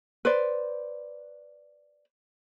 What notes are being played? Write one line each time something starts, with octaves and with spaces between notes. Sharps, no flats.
B4 C5 D5